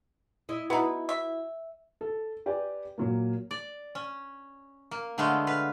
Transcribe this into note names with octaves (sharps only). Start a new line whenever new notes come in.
E4 D#5
B3 D#4 E4 F#4 B4
E5
A4
G4 B4 D5 G5 G#5
A#2 F#3 A#3
D5
C#4
A#3
D3 G#3 A3 B3 F5
B4 F5